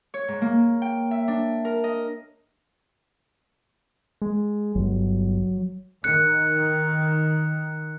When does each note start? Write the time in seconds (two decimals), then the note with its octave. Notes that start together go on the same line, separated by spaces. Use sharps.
0.14 C#5
0.28 G#2
0.41 A#3
0.82 G5
1.11 E5
1.28 D4
1.65 A#4
1.84 D#5
4.22 G#3
4.75 G1 F#3
6.04 D#3 F#6 C#7